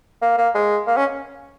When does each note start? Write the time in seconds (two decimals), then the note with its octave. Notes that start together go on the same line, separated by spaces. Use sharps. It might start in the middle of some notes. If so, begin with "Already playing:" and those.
0.22 A#3
0.38 A#3
0.55 G#3
0.87 A#3
0.97 C#4